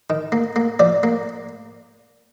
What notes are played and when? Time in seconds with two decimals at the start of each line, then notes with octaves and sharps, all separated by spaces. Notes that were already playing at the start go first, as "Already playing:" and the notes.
0.10 D#3
0.32 A#3
0.56 A#3
0.79 F3 D5
1.03 A#3